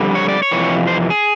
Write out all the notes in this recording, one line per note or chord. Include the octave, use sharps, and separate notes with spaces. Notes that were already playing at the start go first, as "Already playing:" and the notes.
Already playing: F2 D3 G3
C#5
D5
C#5
F2 C3 E3
C5
G#4